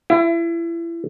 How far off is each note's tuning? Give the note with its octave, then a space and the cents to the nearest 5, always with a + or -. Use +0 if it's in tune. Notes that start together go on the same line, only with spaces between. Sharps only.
E4 +30